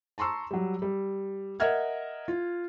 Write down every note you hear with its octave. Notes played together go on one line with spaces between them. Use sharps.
A5 A#5 C6 C#6 E6
F#3 G3
G3
A#4 D#5 E5 F#5 F6 G#6
F4